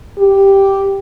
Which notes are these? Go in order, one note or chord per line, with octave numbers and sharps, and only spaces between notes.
G4